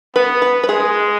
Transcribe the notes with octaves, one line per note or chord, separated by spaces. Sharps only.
B3 B4
B4
B4
G#3 G#4